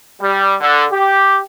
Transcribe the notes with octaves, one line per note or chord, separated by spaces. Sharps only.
G3
D3
G4